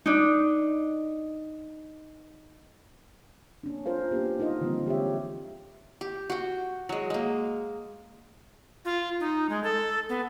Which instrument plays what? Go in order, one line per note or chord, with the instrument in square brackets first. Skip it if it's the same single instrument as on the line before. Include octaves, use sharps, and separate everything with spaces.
[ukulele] D4 D#4
[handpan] A#3 C#4 D4
F4 A#4 C5 F5
A#3 B3 D4 G4
G#3 D#4 F4 A#4 D#5
D3 E3 F3 G3 A#3 C4
G#3 G4 C#5 E5
[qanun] G4
F#4 G5
F#3 G#3
G#3 A#3
[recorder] F4
D#4
G#3
A4
B3